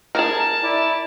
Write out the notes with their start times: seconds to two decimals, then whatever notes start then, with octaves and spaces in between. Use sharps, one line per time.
0.15 G#4 A#4 A5
0.63 E4 D5